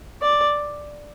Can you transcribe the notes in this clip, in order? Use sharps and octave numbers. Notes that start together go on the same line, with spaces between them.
D5